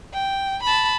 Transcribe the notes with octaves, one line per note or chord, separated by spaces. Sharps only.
G5
A5 B5